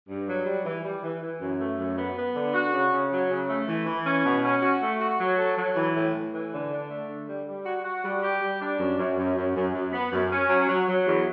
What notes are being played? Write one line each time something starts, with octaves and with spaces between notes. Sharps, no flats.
G2
F#3
G3
E3
G3
E3
E3
F#2
A3
F#2
B3
B3
D3
F#4
C#3
C#3
F#3
C#3
A3
E3
E3
C#4
B2
C#4
F#4
A3
F#4
F#3
A4
F#3
E3
A2
A2
E3
D3
D4
A3
D3
G3
G3
F#4
F#4
G3
G4
G3
D4
F#2
F#2
F#2
F#2
F#2
F#2
B3
F#2
C#4
F#3
F#3
F#3
E2